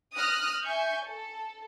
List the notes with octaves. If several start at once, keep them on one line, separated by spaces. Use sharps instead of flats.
D#6 F6 F#6 A#6
E5 G#5 C#6 G6
A4